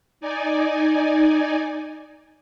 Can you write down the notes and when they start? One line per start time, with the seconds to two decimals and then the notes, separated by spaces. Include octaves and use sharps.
0.21 D#4 D5 G#5